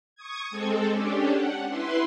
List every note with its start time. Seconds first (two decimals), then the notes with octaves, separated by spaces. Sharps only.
0.15 C#6 D#6 G#6
0.50 G#3 C4 A4
0.89 C#4 D4 G4
1.33 F#5
1.69 E4 B4 C6